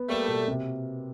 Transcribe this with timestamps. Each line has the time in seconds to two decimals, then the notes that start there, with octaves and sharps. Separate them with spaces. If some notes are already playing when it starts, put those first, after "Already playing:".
Already playing: B3
0.09 G3 A3 A#3
0.28 B2
0.48 C3